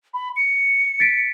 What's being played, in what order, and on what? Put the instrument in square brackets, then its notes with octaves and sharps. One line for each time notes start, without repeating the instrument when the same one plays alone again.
[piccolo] B5
C#7
[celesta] A6 B6 D7